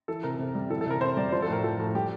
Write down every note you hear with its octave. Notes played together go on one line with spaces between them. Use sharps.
E3 A4
C3 A#4
C3
G3
E3 A4
A4
C3 A#4
C3 C5
G3 D5
F3 C5
A4
A2
A#4
F3 A4
A2
G3 G4